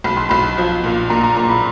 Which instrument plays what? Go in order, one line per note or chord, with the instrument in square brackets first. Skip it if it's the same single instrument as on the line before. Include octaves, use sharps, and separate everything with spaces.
[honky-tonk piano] B1 [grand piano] B5
[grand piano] C6
[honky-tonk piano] B1 [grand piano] B5
[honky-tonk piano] F3
A#2
[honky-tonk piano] A#2 [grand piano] A#5
[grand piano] A#5
[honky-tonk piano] A#2 [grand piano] A#5
[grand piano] B5